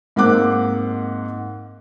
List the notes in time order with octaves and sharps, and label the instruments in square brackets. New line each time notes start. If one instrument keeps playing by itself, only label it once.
[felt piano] G#2 A#3 C4 F#5 D6 F#6